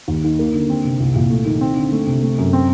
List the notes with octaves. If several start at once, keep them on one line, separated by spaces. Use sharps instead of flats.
D#2
D#3
A#3
D3
C4
C3
C2
A#2
A3
D#3
C4
D3
A3
C3
A3
F#2
C4